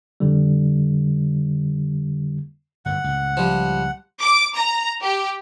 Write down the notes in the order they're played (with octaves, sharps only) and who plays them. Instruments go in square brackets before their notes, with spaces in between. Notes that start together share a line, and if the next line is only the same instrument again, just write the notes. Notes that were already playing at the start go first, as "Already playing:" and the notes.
[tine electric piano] F2 D3 G3
[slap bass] G1 F#2 A2 [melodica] F#5
[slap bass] C#2 A2
[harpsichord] F3 G3
[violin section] D6
A#5
G4